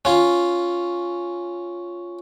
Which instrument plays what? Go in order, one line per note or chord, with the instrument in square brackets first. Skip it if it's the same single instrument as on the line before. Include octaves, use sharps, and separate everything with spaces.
[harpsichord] C#4 F4